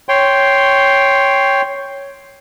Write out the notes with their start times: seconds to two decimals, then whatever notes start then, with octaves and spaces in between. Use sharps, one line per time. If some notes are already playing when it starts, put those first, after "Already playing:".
0.09 C#5 G5 C6